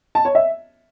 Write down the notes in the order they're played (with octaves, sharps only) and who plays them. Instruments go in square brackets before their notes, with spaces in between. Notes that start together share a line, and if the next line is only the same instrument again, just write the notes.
[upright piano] A5
C#5
E5